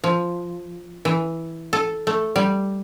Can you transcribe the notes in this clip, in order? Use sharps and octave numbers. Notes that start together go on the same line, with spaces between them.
F3
E3
A4
A3
G3